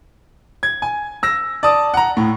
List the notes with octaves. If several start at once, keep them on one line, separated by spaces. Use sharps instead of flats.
G#6
G#5
E6 A#6
D5 A5 D#6
F#5 A#5
A2